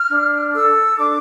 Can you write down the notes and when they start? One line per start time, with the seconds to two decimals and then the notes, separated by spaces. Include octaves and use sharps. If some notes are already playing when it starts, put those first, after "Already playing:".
Already playing: F6
0.10 D4
0.54 A4 E6
0.98 D4 D6